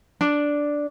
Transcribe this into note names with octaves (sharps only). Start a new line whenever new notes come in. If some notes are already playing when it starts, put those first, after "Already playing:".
D4